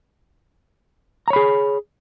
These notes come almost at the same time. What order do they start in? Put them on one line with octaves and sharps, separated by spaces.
A#5 C#5 B5 G#4